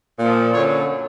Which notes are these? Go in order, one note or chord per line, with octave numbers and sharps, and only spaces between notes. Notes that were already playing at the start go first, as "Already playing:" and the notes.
A#2 F3
F#2 D3 F#3 C#5